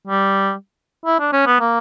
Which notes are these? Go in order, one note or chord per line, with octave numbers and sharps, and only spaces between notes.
G3
E4
D4
C#4
B3
A#3